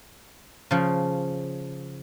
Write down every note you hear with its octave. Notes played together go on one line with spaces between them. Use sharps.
C#3 F3